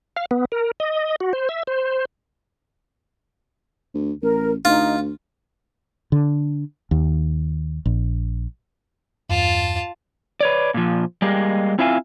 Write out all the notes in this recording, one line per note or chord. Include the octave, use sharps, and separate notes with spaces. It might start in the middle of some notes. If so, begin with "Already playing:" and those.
F5
B3
A#4
D#5
F#4
C5
E5
C5
D2
A1 A#4
D2 D#4 F4
D3
D#2
A#1
E2 G2 F4 A5
B4 C#5 D5
A#2 F3
G3 G#3 A#3 G4
C4 E4 F4 E5 F5 G#5